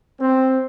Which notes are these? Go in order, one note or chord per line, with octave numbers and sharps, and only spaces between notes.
C4